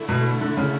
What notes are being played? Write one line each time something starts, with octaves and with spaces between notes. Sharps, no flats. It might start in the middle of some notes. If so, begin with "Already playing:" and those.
Already playing: D3 A3 E4
B2
D3
C#3